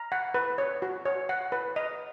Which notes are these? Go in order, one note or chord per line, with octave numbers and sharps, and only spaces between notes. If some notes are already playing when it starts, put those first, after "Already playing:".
Already playing: A#5
F#5
B4
C#5
F#4
C#5
F#5
B4
D#5